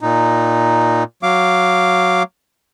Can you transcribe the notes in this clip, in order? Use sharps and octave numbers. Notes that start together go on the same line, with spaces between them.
A#2 D#4
F#3 F5 D6